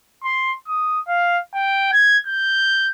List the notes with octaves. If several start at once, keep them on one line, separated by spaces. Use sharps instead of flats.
C6
D#6
F5
G5
G#6
G6